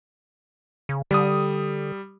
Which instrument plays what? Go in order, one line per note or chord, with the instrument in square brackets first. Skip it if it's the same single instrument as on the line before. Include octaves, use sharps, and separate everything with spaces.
[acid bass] C#3
[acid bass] D3 [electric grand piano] G3 D#6